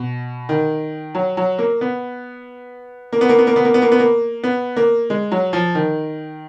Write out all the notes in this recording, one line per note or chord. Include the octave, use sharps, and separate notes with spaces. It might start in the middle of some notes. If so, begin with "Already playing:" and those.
Already playing: B2
D#3
F#3
F#3
A#3
B3
A#3
B3
A#3
B3
A#3
B3
A#3
B3
A#3
B3
A#3
B3
A#3
G#3
F#3
F3
D#3